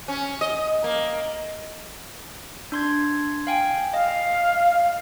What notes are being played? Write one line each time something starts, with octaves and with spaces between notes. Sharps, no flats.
C#4
D#5
A#3
D4 C6 G#6
F5 G5 G#5
D#5 F5